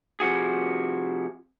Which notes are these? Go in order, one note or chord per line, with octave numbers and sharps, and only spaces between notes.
C3 F3 F#4 G#4